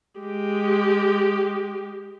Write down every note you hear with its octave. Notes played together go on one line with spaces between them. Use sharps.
G#3 G4